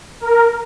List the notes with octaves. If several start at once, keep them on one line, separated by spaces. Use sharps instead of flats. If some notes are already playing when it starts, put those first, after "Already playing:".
A#4